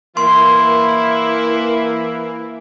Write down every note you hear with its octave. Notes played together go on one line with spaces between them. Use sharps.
E3 A#3 E4 C6